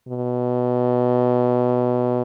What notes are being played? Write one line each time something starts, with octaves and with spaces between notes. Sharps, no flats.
B2